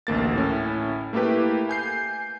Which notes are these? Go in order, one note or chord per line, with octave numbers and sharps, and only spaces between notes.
A1 D2 A#3 A6
A2 C#4 E4
A3 A#3 E4 G4 B4
G#5 G6 C7